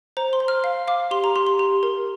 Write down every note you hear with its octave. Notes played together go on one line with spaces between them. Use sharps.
C5 A#5
C6
C5
F6
F5
F5 D6
G4 C6
A#5
G4 C6
C6
G4
A#4